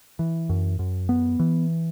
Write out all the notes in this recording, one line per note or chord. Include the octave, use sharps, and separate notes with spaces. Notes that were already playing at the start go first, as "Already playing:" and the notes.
E3
F#2
F#2
B3
E3